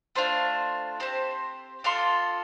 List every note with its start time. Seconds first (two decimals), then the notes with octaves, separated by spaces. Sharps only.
0.15 A3 D4 F4 C5
1.00 C4 G4 C5
1.84 D4 F4 A4 C6